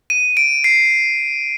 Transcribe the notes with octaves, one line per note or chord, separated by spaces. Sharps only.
D#7
D7
C7